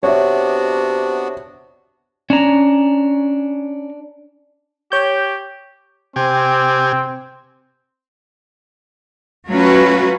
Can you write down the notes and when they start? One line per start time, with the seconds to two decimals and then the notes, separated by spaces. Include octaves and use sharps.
0.03 C3 B3 D4 F#4 C#5 E5
2.30 C#4 D4 A#5
4.92 G4 C#5 G6
6.16 C3 C4 G4 G#5
9.48 F#3 A3 C#4 F4 F#4 B4